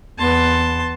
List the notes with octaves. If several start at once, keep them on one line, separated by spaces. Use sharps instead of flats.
E2 B3 A5 C6